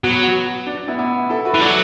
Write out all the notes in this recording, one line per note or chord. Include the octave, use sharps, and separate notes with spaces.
F#3 B3
D4
D4
B3 E4
B3 E4
E4 A4
F#4 B4
E3
F#3 A4 D5